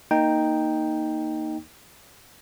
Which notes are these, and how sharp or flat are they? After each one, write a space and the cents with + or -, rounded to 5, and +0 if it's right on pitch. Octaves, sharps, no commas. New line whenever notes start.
A#3 -5 D#4 +0 G5 +0